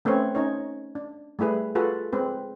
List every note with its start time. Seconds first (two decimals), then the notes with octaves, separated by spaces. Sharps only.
0.05 A3 C4 C#4 B4 C#5
0.35 C#4 D#4 C#5
0.95 D4
1.39 G3 A3 E4 G#4 B4
1.75 F4 F#4 G#4 A4 B4
2.13 G#3 C4 B4